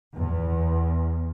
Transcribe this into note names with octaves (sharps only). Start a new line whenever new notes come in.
E2